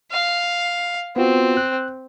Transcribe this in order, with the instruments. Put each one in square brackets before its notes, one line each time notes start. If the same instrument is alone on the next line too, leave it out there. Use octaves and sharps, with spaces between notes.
[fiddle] F5
[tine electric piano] B3 F4 F#4 [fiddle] C4
[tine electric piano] F#6